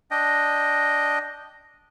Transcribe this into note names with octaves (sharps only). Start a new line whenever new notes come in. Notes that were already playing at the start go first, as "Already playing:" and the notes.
D4 D#5 G5